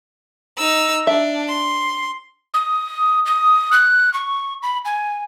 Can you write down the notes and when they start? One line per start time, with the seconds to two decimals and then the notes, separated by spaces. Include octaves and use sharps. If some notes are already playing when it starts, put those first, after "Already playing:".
0.57 D#4 E6
1.07 D4 E5
1.49 C6
2.54 D#6
3.26 D#6
3.72 F#6
4.14 C#6
4.63 B5
4.85 G#5